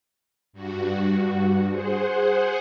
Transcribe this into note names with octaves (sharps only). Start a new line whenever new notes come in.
G2 F#4
G#4 C5 F#5